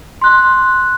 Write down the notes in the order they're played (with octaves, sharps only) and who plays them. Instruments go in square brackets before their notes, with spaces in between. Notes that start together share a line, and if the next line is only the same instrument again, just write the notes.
[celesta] C6 F#6